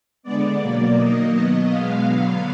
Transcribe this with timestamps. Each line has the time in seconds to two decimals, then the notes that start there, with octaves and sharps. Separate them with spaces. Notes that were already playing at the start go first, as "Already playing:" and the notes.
0.23 D3 G#3 B3 D5
0.59 B2 F#3 A#3
0.95 D#3 F#3 A#3 D#5
1.31 B2 F#3 B3
1.68 B2 G#3 B3 F5
2.04 D3 F#3 B3